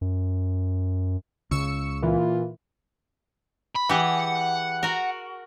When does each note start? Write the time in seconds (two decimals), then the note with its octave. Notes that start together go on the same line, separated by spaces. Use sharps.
0.01 F#2
1.51 C#2 C#3 C#6 E6 C#7
2.03 A#2 E3 F4
3.75 B5
3.89 E3 G4 G#4 F#5
4.83 F#4 A#4